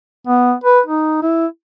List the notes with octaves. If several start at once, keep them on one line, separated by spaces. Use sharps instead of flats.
B3
B4
D#4
E4